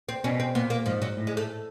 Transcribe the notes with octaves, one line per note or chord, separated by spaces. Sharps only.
C4
B2 C#4
C4
A#2 B3
A#3
G#2 F3
F#3
A2
G#3
A3